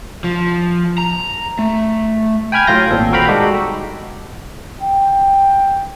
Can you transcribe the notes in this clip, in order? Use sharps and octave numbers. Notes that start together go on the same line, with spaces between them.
F3
A#5
A3
G5 G#5 B5 F6 G#6
A2 F#3 F4 F5 G6 A#6
G#1 A#2 C4 A4
F#4 A#4 F5 G5 A#5 B5
G3 G#3 D#4 F#4 G4 A4
G5